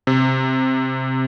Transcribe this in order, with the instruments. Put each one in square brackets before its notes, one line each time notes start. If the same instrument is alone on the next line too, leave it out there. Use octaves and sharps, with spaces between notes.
[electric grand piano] C3